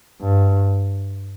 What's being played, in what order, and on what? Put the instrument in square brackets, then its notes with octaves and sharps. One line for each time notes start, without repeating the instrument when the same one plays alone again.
[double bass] G2